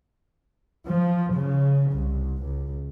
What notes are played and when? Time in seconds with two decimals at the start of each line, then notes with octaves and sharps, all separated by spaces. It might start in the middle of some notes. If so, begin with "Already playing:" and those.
0.86 F3
1.35 C#3
1.92 C2
2.42 C#2